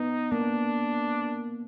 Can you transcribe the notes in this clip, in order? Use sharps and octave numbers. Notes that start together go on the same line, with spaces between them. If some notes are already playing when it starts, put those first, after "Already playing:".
Already playing: B3 D#4
A#3 D4